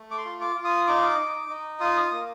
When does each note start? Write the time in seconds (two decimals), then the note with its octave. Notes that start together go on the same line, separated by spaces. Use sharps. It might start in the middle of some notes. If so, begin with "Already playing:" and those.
Already playing: A3
0.11 D6
0.18 C6
0.25 F4
0.41 D6
0.56 F4
0.65 D#6
0.87 D#4 D6
1.18 D#4
1.49 D#4
1.80 F4 D#6
2.03 D#6
2.12 A#3